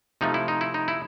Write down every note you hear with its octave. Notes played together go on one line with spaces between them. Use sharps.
C3 F3 A3 D#4
E4
D#4
E4
D#4
E4